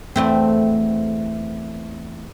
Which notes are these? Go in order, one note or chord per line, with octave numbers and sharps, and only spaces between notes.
E2 A3 C4